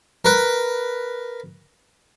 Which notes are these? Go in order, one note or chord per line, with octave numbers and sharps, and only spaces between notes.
A#4 B4